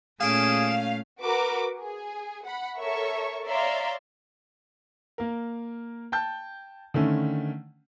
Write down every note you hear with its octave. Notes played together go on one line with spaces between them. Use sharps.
A#2 A3 C#4 G#4 F5 D7 E7
F#4 A#4 B4 D6
G#4
F#5 B5
A4 A#4 C#5 E5 C#6
C#5 D5 E5 F5 A#5 C6
A#3 A#4
G5 A5 G6
D3 D#3 A3 C#4